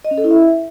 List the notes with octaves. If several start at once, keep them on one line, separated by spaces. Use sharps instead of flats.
D#5
C#4
A4
E4
E5